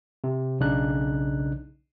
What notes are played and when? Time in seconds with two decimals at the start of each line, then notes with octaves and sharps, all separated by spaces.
0.24 C3
0.60 B1 C#3 D4 D#4 F#6